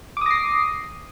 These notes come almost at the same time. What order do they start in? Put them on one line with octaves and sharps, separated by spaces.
D6 D#6 A#6 C7